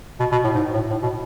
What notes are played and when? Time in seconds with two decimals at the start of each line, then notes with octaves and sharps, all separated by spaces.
0.20 B2
0.32 B2
0.44 A2
0.55 G#2
0.73 A2
0.90 A2
1.02 B2